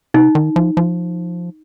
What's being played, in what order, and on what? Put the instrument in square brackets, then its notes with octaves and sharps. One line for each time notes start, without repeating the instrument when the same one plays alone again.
[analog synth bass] C3 [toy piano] D#4
[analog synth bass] D#3
F3
F3